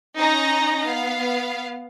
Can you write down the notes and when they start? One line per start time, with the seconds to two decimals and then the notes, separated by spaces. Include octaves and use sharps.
0.16 C#4 D#4 A#5 A#6
0.84 B3 F5